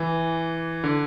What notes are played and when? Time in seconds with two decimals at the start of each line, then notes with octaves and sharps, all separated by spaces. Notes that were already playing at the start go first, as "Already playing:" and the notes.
Already playing: E3
0.84 D3